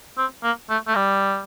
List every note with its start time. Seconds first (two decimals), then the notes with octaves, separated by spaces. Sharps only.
0.18 C4
0.43 A#3
0.70 A3
0.87 A3
0.95 G3